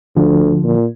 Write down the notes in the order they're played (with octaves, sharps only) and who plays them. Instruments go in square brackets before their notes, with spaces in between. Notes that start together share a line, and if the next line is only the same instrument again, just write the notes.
[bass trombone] D2 [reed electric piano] D3 F3
[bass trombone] A#2